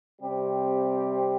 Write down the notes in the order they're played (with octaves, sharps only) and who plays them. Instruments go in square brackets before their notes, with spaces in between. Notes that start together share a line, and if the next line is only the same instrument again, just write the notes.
[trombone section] C3 G3 C4 G4